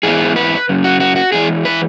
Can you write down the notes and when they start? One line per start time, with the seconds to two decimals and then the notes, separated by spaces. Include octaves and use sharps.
0.03 G#2 E3 B3 G#4
0.36 B4
0.69 F#2 C#3
0.84 F#4
1.00 F#4
1.16 F#4
1.32 E2 E3 G#3 G#4
1.65 B4